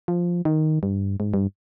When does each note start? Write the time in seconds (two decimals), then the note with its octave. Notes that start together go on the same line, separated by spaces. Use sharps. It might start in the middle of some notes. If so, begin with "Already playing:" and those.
0.08 F3
0.45 D#3
0.83 G2
1.20 G#2
1.34 G2